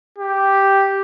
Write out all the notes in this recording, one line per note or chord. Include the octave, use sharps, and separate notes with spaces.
G4